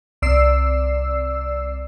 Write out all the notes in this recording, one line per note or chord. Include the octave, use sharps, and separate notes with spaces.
C2 D5 E6 C7